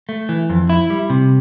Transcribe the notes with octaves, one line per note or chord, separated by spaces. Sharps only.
A3
E3
F2
E4
G3
C3